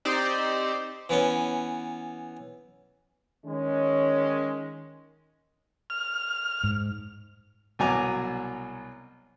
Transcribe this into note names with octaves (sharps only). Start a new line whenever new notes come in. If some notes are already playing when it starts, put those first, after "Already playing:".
C4 D#4 G4 C5 D5
E3 B3 C#4
D#3 G#3 C#4
F6
G#2
C2 B2 F#3 G#5 A#5 D6